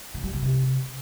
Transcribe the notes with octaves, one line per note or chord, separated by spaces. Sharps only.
E3
G3
B2
C3